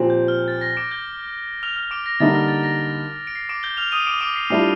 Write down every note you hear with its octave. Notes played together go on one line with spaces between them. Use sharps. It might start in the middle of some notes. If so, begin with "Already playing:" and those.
Already playing: A#2 F3 C4 G4
G6
F6
A6
A#6
D6 D7
G6 G7
F6 F7
F6 F7
D6 D7
A#6
D3 G3 A#3 D#4 A6
F6
A6
A#6
D7
C7
D6 D7
G6 G7
F6 F7
D#6 D#7
D6 D7
D6 D7
C7
A2 G3 D4 F4 C7